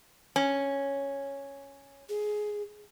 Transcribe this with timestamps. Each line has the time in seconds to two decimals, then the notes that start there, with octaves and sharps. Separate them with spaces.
0.36 C#4
2.09 G#4